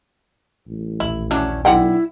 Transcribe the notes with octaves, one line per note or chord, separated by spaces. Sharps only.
A1
A#1 D#2 E4
E3 F#3 C#4 D4
B1 D3 E4 F#5 G5